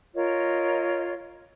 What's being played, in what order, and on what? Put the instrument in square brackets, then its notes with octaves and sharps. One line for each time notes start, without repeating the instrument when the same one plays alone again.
[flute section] F4 A#4 C#5 D#5